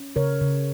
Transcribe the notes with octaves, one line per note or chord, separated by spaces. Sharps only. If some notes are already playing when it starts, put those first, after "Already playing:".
Already playing: C#4
C#3 A#4 C#5
C#3